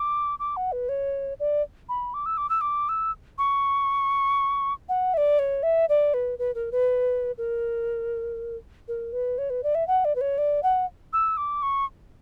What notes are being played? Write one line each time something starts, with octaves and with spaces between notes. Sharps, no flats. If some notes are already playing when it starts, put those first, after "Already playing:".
Already playing: D6
D6
F#5
B4
C#5
D5
B5
D6
E6
D6
E6
D6
E6
C#6
F#5
E5
D5
C#5
E5
D5
B4
B4
A#4
B4
A#4
A#4
B4
C#5
B4
D5
E5
F#5
D5
B4
C#5
D5
F#5
E6
D6
C#6